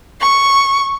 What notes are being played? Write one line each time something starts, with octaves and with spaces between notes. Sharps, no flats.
C#6